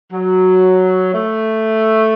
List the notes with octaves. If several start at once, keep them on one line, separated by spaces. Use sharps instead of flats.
F#3
A3